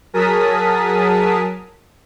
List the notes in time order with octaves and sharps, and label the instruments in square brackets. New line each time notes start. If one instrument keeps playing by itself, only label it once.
[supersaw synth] F#3 G#4 A#4 A5 D#6 B6